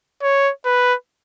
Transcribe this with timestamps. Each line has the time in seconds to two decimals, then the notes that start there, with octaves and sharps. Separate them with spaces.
0.22 C#5
0.65 B4